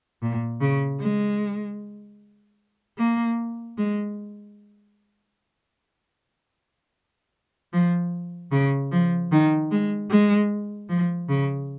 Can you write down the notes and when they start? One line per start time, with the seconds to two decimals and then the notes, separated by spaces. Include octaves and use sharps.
0.22 A#2
0.61 C#3
1.00 G#3
2.98 A#3
3.78 G#3
7.73 F3
8.52 C#3
8.92 F3
9.32 D#3
9.71 G#3
10.10 G#3
10.89 F3
11.29 C#3